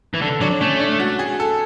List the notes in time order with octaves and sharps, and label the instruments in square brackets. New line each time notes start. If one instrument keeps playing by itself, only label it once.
[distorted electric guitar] E3
[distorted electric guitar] D3 [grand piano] A4
[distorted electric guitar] F#3 [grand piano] D4
[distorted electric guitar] A3 [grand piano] C#4
[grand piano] D4
F#4
G#4
A4